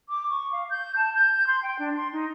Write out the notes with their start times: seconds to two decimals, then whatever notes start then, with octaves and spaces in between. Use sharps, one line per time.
0.09 D6
0.30 C#6
0.52 F5
0.70 G6
0.96 A5
1.15 G6
1.47 C6
1.63 G5
1.79 D4
1.97 C6
2.13 D#4